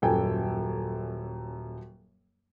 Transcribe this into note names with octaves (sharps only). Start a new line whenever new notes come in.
D#1 F#2 A4 G5 G#5